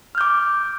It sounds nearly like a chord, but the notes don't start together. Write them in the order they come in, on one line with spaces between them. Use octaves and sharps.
F6 G6 D6